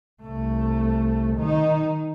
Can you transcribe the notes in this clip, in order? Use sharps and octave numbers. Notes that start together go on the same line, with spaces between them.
C2 A3
D#3 D#4